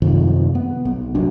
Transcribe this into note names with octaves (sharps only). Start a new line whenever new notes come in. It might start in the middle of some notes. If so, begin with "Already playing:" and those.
F#2 C3 D#3 F3
B3
B1
F1 A#1 F#3 D4